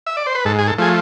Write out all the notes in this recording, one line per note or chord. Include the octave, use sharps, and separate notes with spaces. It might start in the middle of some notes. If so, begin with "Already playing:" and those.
E5
D5
C5
B4
G#2 A4
G#4
A4
F3 A3 G#4